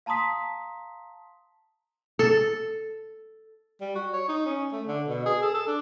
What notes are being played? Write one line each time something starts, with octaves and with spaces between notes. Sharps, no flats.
F5 A5 A#5 C6 D#6 B6
A4
G3
F#4
C#5
D#4
C#4
A3
D3
B2
G#4
A4
A4
D4